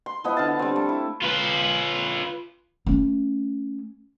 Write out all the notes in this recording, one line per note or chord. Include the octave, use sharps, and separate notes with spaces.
C6
F3 B3 E4 D#5
D3 F5 A5
G3 C4
A3
E4
F4 B4
A3 C#4